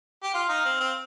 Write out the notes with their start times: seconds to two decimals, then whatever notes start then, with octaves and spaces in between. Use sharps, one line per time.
0.23 G4
0.34 F4 F5
0.49 D#4
0.65 C4
0.80 C4